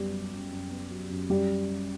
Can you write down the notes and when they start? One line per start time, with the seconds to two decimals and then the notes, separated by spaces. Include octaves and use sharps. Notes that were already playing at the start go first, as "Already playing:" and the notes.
Already playing: F#2 G3 B3 G4
0.11 F#3
0.31 F#2
0.51 F#2
0.71 B3
0.91 F#3
1.10 F#2
1.30 F#2 G3 G4